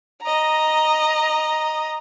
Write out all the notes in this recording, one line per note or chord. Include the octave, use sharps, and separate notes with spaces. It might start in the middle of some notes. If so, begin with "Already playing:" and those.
D#5 A#5